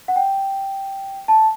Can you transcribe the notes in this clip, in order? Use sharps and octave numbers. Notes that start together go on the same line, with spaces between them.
F#5
G5
A5